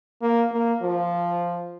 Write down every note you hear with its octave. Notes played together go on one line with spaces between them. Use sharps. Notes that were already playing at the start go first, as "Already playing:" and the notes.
A#3
A#3
F3